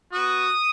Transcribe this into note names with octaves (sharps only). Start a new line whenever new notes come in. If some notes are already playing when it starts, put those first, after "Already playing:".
B3 F#4 D#6